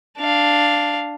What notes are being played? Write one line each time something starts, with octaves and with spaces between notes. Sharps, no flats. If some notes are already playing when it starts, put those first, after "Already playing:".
D4 F5